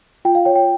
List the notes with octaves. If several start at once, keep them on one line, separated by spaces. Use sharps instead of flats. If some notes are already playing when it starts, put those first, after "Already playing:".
F4 G5
F5
C#5 G5
G5